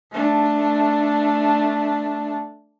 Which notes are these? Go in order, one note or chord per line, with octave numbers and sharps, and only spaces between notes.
A3 D4